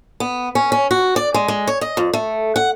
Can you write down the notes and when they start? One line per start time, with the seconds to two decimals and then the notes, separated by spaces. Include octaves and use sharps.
0.20 B3
0.55 C#4
0.72 C#4
0.91 F#4
1.16 D5
1.34 G#3
1.48 G#3
1.67 C#5
1.81 D#5
1.97 F2
2.13 A3
2.56 F#5